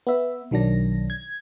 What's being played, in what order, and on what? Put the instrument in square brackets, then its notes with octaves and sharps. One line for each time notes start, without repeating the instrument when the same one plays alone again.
[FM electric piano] B3 E5
B1 D#3 F#3 D4 A#6
G#6